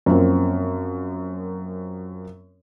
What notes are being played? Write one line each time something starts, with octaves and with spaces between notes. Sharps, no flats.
F#2 F3 A#3 C4 C#4